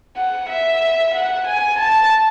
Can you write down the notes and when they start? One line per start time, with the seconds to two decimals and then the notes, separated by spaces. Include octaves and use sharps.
0.17 F#5
0.49 E5
1.14 F#5
1.47 G#5
1.79 A5